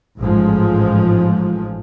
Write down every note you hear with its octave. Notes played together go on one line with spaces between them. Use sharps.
A1 G#2 F3 G#3